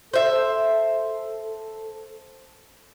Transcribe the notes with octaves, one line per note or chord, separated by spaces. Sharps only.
A4 C5 E5